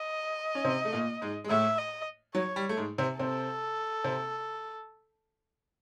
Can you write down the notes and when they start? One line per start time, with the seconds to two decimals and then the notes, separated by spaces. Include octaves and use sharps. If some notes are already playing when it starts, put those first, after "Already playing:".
Already playing: D#5
0.55 C#4
0.64 C3 C4
0.85 A3
0.93 A#2 A#3
1.21 G#2 G#3
1.44 G#3
1.49 A2 A3 E5
1.78 D#5
2.34 F#3 C#5
2.56 G3
2.69 A3
2.77 G#2 G#3
2.98 C3 C4
3.19 C3 C4 A4
4.04 C3 C4